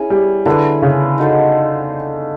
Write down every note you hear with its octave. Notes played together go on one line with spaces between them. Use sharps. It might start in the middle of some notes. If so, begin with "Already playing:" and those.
Already playing: C#4 E4 G#4
G3
D3 E4 G#4 B4
C#3
D#4 F#4 A4 C5